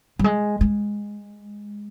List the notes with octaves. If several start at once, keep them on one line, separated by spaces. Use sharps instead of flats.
G3
G#3
G#3